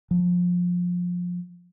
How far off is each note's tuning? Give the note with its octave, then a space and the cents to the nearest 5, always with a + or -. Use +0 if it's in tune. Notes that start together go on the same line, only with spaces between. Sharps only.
F3 +25